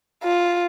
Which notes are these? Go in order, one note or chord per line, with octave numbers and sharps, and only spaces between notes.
F4